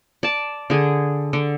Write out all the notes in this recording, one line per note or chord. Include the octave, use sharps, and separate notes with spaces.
D5 A5
D3 G#4
D3